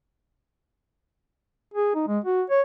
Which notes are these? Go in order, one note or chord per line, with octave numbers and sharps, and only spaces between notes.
G#4
D#4
G#3
F#4
C#5